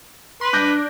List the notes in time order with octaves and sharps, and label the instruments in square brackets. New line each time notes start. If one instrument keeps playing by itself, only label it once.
[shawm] B4 [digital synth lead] C6
[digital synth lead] D4 [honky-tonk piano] F#6 G6 A#6